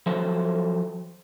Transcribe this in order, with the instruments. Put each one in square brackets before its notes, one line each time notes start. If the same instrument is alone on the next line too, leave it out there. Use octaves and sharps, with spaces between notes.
[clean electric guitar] F3 F#3 A4 C5 C#5 E5